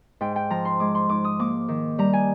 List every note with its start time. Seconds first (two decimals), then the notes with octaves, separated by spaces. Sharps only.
0.21 G#2 G5
0.36 G5
0.50 F3 A#5
0.65 C6
0.80 G#3 D6
0.95 C6
1.09 G#2 D6
1.24 D#6
1.39 A#3 D6
1.68 D#3
1.98 G3 A#5
2.13 G#5